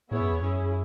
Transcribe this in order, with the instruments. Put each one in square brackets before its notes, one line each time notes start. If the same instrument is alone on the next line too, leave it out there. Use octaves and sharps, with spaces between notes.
[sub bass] A2 [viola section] B3 E4 G#4 C#5
[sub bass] F#2
E2
[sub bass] F#2 [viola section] C#4 E4 G#4